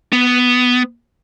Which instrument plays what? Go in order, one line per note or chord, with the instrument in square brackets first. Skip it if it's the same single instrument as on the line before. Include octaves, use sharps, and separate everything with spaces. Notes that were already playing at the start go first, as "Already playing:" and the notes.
[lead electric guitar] B3